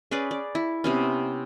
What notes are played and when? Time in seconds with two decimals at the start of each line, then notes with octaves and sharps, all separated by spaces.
0.11 C#4 G#4 B4 D5
0.31 D5
0.55 E4
0.84 C3 B3 C#4